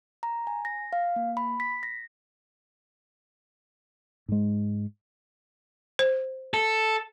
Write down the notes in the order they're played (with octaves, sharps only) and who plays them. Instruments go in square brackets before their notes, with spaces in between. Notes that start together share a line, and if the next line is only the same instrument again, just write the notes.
[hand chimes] A#5
G#5
A#6
F5
A#3
B5
B6
A#6
[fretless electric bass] G#2 G#3
[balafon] C5
[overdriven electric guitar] A4